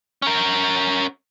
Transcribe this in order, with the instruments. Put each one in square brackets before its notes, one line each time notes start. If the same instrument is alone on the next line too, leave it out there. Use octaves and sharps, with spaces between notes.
[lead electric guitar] C#4 A#4